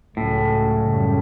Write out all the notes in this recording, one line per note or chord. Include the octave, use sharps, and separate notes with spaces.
C#2 A2 C#3 F#3 A3 C#4
F#2 C#3 G3 C#4